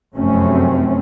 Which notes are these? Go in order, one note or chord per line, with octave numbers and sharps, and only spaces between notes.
F1 F#2 A3 C4 C#4